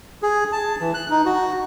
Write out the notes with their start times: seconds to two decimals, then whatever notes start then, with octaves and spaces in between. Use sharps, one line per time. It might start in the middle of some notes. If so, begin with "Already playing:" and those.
0.22 G#4
0.52 A5
0.81 E3
0.94 F#6
1.10 D#4
1.26 F#4